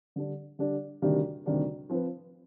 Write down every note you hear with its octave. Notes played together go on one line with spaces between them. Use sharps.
D3 G3 D4
D3 G3 D4
D2 C3 D#3 G3 D4
D2 C3 D#3 G3 D4
F3 C4 F4 B4